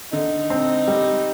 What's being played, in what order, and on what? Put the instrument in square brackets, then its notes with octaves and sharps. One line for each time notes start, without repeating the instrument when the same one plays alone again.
[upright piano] D3 [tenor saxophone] D#4
[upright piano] C4
G3